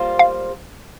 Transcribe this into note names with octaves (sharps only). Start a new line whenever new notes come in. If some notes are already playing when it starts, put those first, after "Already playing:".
Already playing: G3 A#3 F4 C5
F5